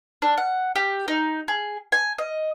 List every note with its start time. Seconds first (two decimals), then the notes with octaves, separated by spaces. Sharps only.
0.22 D4
0.38 F#5
0.76 G4
1.08 D#4
1.48 G#4
1.92 G#5
2.18 D#5